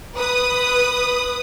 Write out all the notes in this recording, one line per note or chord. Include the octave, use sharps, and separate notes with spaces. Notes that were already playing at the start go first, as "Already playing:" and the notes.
B4 D#6